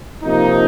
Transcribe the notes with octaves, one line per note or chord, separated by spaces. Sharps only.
C3 F3 A#3 D#4